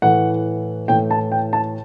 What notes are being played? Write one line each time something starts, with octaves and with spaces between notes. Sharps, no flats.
A2 E3 A3 F#5
A2 E3 A3 G5
A5
G5
A5